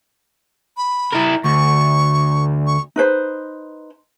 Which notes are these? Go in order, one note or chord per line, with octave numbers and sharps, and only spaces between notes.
B5
E4 A#4
D2 C#6
C#6
D#4 B4 C5